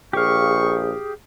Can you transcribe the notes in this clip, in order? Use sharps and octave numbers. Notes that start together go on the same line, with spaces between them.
A#1 G4 G#4 F5 C#6